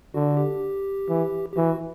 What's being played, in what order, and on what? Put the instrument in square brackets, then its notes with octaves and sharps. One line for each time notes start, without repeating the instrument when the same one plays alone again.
[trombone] D3 [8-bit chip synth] F#4
[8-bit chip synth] G4
[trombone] E3
[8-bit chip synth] G4
[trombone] E3 [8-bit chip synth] F#4